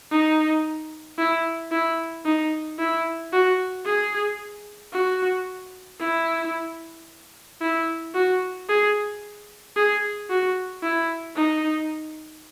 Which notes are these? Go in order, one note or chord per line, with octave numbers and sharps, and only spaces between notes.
D#4
E4
E4
D#4
E4
F#4
G#4
F#4
E4
E4
F#4
G#4
G#4
F#4
E4
D#4